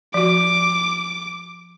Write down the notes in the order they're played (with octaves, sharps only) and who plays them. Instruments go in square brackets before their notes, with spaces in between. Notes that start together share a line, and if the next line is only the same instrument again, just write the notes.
[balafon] F3 F#4 [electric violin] D6